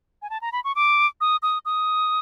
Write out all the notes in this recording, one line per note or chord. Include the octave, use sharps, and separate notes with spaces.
G#5
A5
A#5
B5
C#6
D6
D#6
D#6
D#6